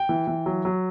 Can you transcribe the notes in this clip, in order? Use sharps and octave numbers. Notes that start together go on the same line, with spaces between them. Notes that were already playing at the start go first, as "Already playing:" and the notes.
Already playing: G5
E3
E3
F#3
F#3